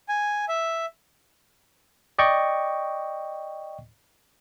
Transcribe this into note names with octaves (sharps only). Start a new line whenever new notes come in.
G#5
E5
D5 D#5 G5 C#6